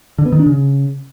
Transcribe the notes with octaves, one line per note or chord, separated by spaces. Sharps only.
D3
B3
D#3
D4
C#3